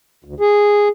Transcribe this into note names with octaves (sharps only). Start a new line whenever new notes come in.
D2
G#4